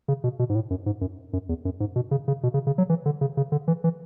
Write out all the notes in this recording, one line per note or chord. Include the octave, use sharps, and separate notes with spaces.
C#3
B2
B2
G#2
A2
F#2
G#2
F#2
F#2
E2
F#2
G#2
B2
C#3
C#3
B2
C#3
C#3
F#3
E3
D3
C#3
C#3
D3
E3
E3